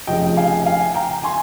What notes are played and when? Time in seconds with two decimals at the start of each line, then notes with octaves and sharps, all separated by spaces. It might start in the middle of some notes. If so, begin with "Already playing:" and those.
0.07 F1 F2 C#3 D#5 G5
0.37 F5 G#5
0.66 F5 G#5
0.94 G5 A#5
1.23 G#5 C6